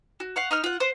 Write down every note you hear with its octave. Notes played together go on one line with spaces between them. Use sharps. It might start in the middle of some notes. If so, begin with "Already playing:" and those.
F#4
F5 F#5 C#6
D#4 D#6 F6
F4 F#5
C5 F#5